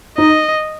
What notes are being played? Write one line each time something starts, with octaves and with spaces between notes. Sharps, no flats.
D#4 D#5